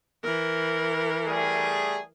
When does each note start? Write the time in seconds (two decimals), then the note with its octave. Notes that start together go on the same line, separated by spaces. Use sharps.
0.24 E3 A#4
1.25 G3 A3 G#4